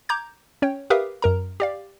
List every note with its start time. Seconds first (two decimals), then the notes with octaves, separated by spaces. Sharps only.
0.09 A#5 D6 G6 G#6
0.62 C#4 C#5 G5
0.90 G4 A#4 B4 E5 F5 D#6
1.22 F#2 A#4 A#5
1.60 G4 D5 F5